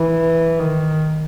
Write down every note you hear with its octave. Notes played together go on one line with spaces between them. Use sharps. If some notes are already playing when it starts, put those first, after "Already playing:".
Already playing: E3
D#3